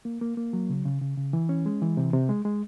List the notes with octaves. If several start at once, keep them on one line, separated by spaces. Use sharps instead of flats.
A#3
A#3
A#3
F#3
C#3
C#3
C#3
C#3
E3
C#4
G#3
E3
C3
C3
G#3
G#3